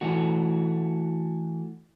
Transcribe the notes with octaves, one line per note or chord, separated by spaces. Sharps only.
E3 A3 F#4